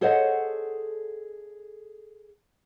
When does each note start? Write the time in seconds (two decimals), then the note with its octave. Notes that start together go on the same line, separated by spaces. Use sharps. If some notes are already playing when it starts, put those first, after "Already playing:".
0.01 G#4 A4 C5 C#5 D#5 F#5